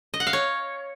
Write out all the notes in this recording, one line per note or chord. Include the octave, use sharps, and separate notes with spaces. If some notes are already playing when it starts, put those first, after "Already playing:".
D#5
F#5
F5
C#5